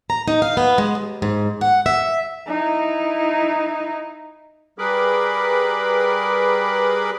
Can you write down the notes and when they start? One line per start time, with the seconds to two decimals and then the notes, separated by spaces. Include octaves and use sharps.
0.10 A#5
0.28 D#4
0.42 F5
0.57 B3
0.78 G#3
0.95 D#2
1.22 G#2
1.61 F#5
1.86 E5
2.47 D#4 E4
4.79 G3 G#4 A#4 B4 B5 D6